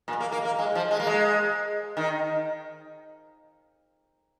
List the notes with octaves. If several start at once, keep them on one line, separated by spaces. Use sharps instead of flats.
A#2
A#3
A#3
A#3
G#3
F3
G#3
A#3
G#3
D#3